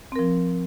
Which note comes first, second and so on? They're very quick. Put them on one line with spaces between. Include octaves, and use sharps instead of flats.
C4 A#4 F3